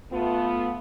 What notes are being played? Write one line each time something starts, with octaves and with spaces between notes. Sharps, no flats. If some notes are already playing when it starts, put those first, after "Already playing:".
A3 B3 F4